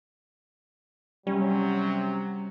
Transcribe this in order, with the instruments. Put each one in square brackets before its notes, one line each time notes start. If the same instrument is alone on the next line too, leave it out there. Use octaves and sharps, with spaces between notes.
[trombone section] C3 F#3 [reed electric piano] G3 [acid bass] C#4